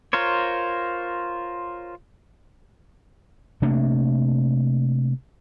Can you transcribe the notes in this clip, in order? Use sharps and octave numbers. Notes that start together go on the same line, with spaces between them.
F4 A#4 C5 C#5
C3 A3 A#3 D4